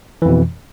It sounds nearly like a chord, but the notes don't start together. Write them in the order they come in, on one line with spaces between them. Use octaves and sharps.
E3 F2 B2